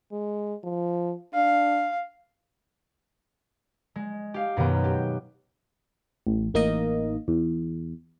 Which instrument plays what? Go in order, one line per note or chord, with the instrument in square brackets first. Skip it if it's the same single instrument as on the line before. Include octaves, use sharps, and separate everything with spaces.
[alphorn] G#3
F3
[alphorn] D4 [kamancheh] F5
[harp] G#3
G4 F5
F#2 B2 D#3 B3 G5
G4
[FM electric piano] A1
A1 A#3 D#4 A#4 D#5
E2